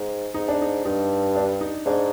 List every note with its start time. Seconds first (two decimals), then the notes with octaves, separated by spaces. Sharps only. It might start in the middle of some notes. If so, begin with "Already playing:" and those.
Already playing: G#2
0.34 G#2 D#4
0.48 D4
0.62 D#4
0.85 G2 D#4
1.36 D4
1.61 D#4
1.86 G#2 D4